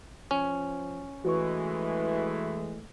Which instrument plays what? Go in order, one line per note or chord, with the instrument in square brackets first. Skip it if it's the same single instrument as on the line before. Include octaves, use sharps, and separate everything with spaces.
[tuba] F3 [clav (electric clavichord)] C#4
[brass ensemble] E3 G#3 [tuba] A3 [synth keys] F#4 B4 C#6